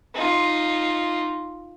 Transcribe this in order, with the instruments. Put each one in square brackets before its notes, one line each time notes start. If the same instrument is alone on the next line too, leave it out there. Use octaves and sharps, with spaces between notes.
[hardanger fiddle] D#4 F4